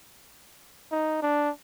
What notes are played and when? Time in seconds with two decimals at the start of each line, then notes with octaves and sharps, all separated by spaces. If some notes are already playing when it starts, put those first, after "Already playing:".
0.91 D#4
1.22 D4